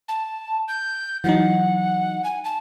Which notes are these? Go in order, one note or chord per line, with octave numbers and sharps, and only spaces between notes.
A5
G6
E3 F#3 D#4 F#5
G#5
A5